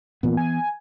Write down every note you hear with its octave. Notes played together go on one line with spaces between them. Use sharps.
A#2 E3 B3
G#5